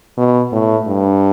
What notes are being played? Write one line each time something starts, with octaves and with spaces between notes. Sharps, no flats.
B2
A2
G2